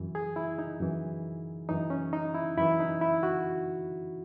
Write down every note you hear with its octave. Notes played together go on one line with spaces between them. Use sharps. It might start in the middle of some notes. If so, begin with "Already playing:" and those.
Already playing: F#2 E3
G#4
E4
D#4
F#2 E3
F#2 E3 D#4
C#4
D#4
E4
F#2 E3 E4
D#4
E4
F#4